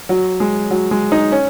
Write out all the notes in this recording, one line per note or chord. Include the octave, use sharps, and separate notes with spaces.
F#3
G#3
F#3
G#3
D#4
C#4